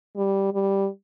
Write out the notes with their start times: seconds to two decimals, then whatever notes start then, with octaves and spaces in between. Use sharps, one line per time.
0.16 G3
0.53 G3